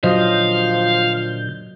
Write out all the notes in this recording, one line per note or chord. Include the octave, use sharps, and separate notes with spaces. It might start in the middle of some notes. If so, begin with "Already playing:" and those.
A#2 D3 F3 F#3 D#5 F5 G6